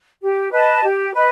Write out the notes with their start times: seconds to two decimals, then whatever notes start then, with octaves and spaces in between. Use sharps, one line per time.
0.23 G4
0.52 B4 D#5 A5
0.83 G4
1.14 B4 D#5